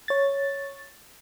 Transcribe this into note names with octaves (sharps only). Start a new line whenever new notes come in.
C#5 A6